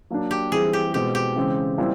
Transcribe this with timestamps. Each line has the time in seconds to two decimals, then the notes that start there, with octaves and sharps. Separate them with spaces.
0.10 F#3 A#3 D4
0.31 G4
0.52 E3 G3 C4 E4 G#4
0.73 G4
0.94 B2 G#3 C4 G4
1.15 G4
1.36 C#3 E3 G#3 C4
1.78 A#2 G3 C4 E4